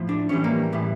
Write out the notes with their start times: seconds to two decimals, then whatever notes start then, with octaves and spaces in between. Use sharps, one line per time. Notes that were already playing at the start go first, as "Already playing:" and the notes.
Already playing: A2 F3
0.09 D4
0.29 A2 E3 G3 C#4
0.44 A#3
0.73 A2 E3 G3